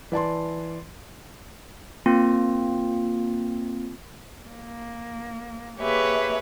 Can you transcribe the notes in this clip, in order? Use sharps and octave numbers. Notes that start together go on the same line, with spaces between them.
E3 D5 A5 C6
A#3 C4 F4
A#3
A#3 G4 G#4 B4 C#5 E5